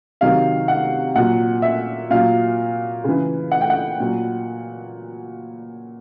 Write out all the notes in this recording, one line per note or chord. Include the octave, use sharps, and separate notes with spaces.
C3 D#3 F#3 F5
F#5
A#2 F#3 F#5
E5
A#2 F#3 F5
C#3 E3
F#5
G5
F#5
A#2 F#3